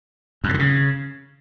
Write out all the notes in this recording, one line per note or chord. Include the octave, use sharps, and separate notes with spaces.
F#2
A2
D3
C#3